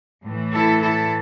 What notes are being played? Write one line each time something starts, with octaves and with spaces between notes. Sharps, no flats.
A2 E3
E4 A4
E4 A4